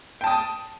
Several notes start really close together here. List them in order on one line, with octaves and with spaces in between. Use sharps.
G5 A5 D#6